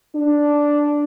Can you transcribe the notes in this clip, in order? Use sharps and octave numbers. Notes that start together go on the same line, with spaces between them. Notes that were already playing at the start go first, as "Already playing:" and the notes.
D4